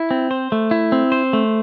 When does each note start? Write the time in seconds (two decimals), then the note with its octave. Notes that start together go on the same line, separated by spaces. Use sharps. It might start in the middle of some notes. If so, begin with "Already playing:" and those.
Already playing: E4
0.11 C4
0.31 C5
0.52 A3
0.71 E4
0.92 C4
1.12 C5
1.33 A3